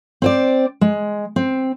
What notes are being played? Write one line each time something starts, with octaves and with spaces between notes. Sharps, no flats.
C4 C5 D5
G#3
C4